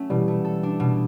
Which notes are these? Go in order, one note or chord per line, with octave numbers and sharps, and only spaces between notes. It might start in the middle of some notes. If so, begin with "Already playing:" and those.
Already playing: F#3 A3 C#4
B2 E3 G3
A3
A4
D4
B2